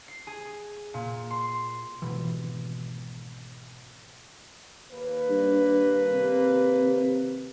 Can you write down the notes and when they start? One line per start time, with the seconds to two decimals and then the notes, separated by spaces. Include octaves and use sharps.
0.08 C7
0.27 G#4
0.94 A#2
1.31 C6
2.02 G#1 B2 E3
4.92 D#2 A#3 B4
5.29 G2
6.13 C3